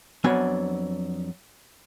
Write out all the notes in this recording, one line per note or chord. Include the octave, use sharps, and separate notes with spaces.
F2 F#3 B3 D4 G#5